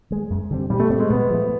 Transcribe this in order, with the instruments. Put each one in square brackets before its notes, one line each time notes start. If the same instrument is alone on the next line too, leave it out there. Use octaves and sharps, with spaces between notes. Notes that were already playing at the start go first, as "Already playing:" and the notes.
[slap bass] D#3 G#3
F#2
D3 G3 C4
[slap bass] A#2 [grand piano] G3
[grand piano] A3
[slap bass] G3 C4 [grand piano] A3
[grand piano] G#3
[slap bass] A#2 [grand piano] B3
[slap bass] F3 A3